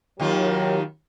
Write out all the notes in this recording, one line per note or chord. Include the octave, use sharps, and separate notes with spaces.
D#2 D#3 F#3 F4 G4 A#4